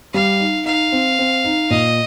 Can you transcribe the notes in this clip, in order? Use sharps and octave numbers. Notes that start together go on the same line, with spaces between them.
G3 F5
D#4
D#4 F5
C4
C4
D#4
A#2 D#5